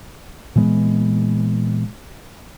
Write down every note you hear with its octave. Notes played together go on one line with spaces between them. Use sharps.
A#2 E3 G#3 B3